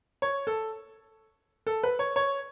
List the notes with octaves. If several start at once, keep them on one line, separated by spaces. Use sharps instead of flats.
C#5
A4
A4
B4
C#5
C#5